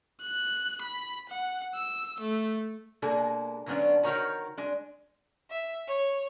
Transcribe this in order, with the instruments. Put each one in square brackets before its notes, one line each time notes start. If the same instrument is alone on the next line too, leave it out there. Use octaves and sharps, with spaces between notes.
[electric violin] F#6
B5
F#5
E6
A3
[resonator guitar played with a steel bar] B2 G#3 A#3 D4 G#4 A4
D3 F#3 G#3 B3 C#4 D4
D#3 F#4 A#4 C5 C#5 A#5
G#3 D4
[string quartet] E5
C#5